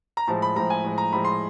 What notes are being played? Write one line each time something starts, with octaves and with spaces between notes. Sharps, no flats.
A#5
A2 F3 G#3 A5
B5
A2 F3 G#3 A#5
G#5
A2 F3 G#3
A#5
A2 F3 G#3 B5
C6